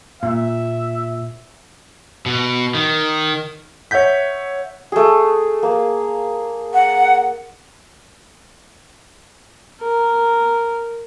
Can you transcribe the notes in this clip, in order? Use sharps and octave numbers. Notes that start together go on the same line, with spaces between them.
A#2 E5
B2
D#3
C#5 E5 F#5 G6 B6
A3 G#4
A#3
F#5
A#4